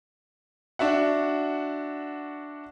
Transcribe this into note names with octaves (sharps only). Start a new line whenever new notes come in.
D4 F#4 E5 F#5